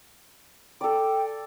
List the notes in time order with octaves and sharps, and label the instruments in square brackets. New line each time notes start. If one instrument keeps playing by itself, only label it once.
[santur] A4 D5 [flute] G5